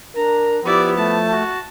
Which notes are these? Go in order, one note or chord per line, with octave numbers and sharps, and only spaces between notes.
D4 A#4 A#5
F3 B3 E4 G4 D5
A3 A5
F#4